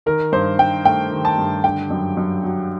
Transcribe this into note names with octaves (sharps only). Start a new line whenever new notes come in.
D#3 A#4
G2 C5
G2 G5
A3 G5
D#3
A5
G2
D3 G5
F#2
F#2
F#3